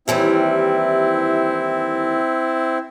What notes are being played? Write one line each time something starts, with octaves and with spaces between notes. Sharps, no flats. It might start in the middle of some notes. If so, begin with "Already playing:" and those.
D#2 E3 G3 C4 E4